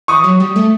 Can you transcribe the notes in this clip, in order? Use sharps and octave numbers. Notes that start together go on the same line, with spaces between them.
E3 C#6 D#6
F#3
G3
A3